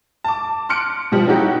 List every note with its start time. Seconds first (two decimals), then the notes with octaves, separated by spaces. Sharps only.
0.24 A5 D6
0.69 C6 F6 F#6 C#7 D7
1.12 B2 F3 G3
1.27 C#4 D#4 E4 F#4 G4